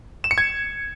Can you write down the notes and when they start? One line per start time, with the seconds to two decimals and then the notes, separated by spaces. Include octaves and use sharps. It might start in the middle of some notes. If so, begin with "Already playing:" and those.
0.24 E7
0.31 C#7
0.38 G#6